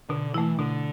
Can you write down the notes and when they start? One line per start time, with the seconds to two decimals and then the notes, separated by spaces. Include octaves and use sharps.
0.09 B2 D3
0.34 E3 A3 E4
0.59 B2 D3